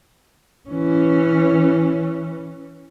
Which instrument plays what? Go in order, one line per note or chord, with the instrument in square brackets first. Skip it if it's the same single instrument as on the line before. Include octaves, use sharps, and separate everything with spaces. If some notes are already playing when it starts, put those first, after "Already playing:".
[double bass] E3 C#4